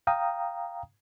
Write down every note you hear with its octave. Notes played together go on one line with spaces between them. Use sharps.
F5 G5 A#5 D#6